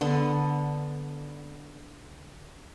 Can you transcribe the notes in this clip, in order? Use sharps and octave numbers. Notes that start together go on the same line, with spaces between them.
D3 B3